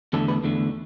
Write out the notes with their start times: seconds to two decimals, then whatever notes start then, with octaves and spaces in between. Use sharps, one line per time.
0.13 E2 D3 A3 A4
0.28 B4
0.44 E2 D3 A3